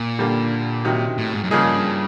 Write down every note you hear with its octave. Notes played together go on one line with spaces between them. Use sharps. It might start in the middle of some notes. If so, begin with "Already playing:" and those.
Already playing: A#2
D3 G3 A#3
C3 D#3 F#3
A2
G#2
F#2
G2 C#3 F3 A#3 D#4 G#4